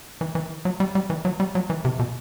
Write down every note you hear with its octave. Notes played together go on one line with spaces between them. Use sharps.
E3
E3
F#3
G3
G3
E3
F#3
G3
F#3
E3
C3
B2